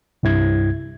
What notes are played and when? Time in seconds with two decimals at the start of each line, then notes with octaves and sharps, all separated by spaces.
0.23 C2 G2 E4 G#6